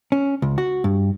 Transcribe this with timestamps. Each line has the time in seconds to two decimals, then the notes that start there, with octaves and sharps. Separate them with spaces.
0.12 C#4
0.42 C#2
0.58 F#4
0.84 G2